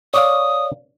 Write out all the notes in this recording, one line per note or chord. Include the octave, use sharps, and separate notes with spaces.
C#5 D5 F5 D#6